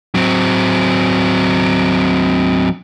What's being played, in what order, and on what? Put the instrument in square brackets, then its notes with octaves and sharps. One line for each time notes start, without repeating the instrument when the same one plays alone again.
[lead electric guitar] F#3 C4